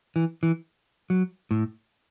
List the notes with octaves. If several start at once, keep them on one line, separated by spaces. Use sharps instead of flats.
E3
E3
F#3
A2